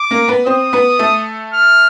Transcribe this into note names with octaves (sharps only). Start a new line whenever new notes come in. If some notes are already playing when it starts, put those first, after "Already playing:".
Already playing: D6
A#3 A#4
B3 B4
C4 C5 D#6
B3 B4
A3 A4
F6